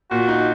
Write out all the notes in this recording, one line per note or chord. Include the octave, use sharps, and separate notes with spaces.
A#2 F#4
D#4